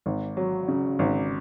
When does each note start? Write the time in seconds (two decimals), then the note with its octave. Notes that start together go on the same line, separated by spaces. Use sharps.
0.06 G#1
0.37 F#3
0.68 C#3
0.99 G#1